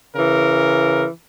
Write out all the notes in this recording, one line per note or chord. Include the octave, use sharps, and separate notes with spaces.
C#3 E3 A#4